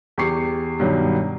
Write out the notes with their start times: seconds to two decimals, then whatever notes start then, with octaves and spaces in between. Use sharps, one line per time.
0.18 E2 G4 C#6 C7 C#7
0.80 G2 B2 D#3 F#3